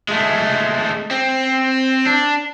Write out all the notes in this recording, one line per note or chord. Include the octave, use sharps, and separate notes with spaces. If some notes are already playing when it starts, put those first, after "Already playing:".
G#3 A3
C4
D4